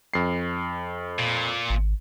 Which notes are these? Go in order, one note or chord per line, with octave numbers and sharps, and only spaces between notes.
F2 C7
A#2
G#1